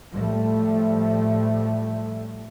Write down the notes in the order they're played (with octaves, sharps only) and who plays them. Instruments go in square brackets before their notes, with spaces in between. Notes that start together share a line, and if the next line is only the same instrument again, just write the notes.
[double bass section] A2 F3 G3 A3